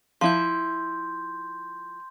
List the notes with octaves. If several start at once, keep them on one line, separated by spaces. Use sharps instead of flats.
F3 E4 C6 G6